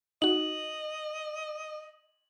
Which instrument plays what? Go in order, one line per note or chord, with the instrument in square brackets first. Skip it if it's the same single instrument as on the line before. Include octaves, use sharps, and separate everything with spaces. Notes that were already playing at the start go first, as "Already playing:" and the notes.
[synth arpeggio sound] D#4 F#4 [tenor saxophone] D#5 [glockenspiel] F#7